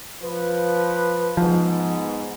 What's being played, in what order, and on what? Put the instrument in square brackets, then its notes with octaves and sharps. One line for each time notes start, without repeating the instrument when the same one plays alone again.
[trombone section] F3 B4
[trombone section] G#2 B3 [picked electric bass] F3